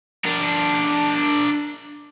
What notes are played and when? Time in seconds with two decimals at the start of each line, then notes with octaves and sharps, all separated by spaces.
0.25 D4 A#4